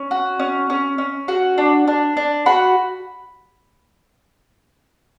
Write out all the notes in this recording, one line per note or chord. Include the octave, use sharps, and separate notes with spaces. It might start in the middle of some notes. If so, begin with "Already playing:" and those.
Already playing: C#4
F#4
C#4
C#4
C#4
F#4
D4
D4
D4
F#4 B5